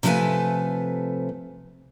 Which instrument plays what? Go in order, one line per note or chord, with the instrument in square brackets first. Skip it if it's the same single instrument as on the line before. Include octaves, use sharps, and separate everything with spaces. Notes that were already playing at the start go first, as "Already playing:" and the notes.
[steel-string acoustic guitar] C3 F3 A3 A4 B4 G#5